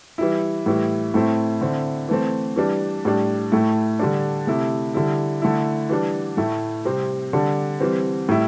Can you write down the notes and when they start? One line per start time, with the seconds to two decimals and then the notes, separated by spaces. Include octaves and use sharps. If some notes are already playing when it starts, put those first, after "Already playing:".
0.18 E3 G3 E4
0.66 A2 E3 G3 E4
1.14 A2 A3 C4 E4
1.61 D3 C4 E4
2.09 E3 A3 C4
2.56 E3 G3 D4
3.05 A2 G3 D4
3.52 A2 A3 E4
3.99 D3 G3 D4
4.47 C3 A3 E4
4.94 D3 G3 E4
5.42 D3 A3 E4
5.89 E3 G3 D4
6.37 A2 A3 E4
6.85 C3 G3 C4
7.33 D3 G3 D4
7.80 E3 G3 C4
8.29 A2 G3 E4